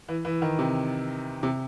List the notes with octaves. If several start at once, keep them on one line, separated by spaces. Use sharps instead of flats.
E3
E3
D#3
C3
C3